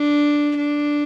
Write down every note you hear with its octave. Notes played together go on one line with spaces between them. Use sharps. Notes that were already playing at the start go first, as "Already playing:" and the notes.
Already playing: D4
D4